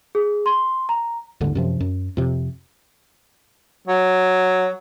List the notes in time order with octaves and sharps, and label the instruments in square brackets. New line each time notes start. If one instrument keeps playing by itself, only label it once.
[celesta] G#4
C6
A#5
[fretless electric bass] D#1 G#1 D#2 D3
F#2 C3 F3
F#2
F2 C3
[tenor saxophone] F#3